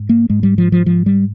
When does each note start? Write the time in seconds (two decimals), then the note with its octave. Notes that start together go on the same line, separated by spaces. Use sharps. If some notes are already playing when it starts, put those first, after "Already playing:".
Already playing: G#2
0.09 A#3
0.30 G#2 G#3
0.43 G3
0.58 F3
0.72 F3
0.86 F3
1.06 G3